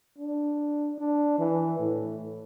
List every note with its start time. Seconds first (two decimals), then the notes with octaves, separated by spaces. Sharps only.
0.18 D4
0.98 D4
1.38 E3
1.79 A2